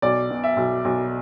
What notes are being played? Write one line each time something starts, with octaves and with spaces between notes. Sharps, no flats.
B1 D5
B2
E5
B1
B1